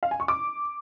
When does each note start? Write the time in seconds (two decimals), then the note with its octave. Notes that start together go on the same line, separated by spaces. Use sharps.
0.03 F5
0.11 G#5
0.20 C#6
0.28 D6